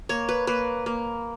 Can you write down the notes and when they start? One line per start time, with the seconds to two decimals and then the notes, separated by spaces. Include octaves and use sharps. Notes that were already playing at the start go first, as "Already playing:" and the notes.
0.09 A#3 C#5
0.29 B4
0.47 A#3 B4
0.86 A#3